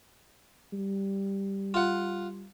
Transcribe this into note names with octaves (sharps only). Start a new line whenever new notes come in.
G3
F4 F#5